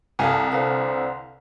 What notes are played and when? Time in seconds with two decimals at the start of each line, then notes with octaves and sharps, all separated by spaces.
0.19 C2 A4 F5 G#5
0.52 D3 A4 B4 C5 F5